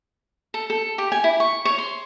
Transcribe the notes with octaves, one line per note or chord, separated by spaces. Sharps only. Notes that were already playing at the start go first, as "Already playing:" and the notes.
A4
A4
G4
G#5
E4
C#6
C#5
C6